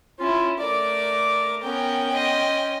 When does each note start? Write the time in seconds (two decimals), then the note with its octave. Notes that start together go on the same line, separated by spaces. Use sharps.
0.19 C#4 E4 F4
0.60 A3 A#4 D5 D6
1.64 B3 C#4 A#4 G5
2.12 D#5 C6